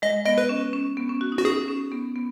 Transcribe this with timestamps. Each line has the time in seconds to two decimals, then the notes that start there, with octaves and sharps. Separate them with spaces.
0.02 G#3 D#5
0.25 B3 D#5
0.38 B4
0.49 C#4
0.73 C#4
0.97 B3
1.09 C#4
1.21 F#4
1.32 D#4
1.38 F#4
1.44 C#4 G#4
1.68 C#4
1.92 B3
2.16 B3